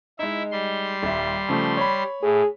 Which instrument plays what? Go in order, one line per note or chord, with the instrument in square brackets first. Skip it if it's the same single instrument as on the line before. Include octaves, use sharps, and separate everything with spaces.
[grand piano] G#3 D#4 [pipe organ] E4 E5
[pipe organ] G3 C6
[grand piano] D#1 E5
C#3 F3 A3
C#5 B5
[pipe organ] A2 [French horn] G#4